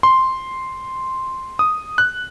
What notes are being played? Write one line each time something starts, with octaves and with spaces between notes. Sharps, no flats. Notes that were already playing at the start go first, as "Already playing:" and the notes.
C6
D#6
F#6